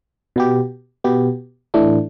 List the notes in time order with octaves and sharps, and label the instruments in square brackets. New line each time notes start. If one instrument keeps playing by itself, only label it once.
[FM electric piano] B2 B3 G4
B2 B3 G4
A2 E3 A3 D4